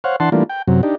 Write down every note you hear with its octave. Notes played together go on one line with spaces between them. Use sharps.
C5 C#5 F5 F#5
E3 D4 F#5 A5 C6
E3 G3 A3 A#3 D4 F4
G5
F#2 C3 F#3
D4 D#4 G4